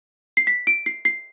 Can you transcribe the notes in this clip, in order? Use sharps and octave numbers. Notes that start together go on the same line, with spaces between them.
C7
B6
D7
C7
C7